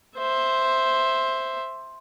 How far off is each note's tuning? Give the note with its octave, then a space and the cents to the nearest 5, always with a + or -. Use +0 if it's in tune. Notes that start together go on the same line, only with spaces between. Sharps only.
C5 +5 E5 +0